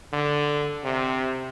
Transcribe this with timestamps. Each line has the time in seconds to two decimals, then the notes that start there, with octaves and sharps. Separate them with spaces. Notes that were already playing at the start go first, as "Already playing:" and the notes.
0.13 D3
0.84 C3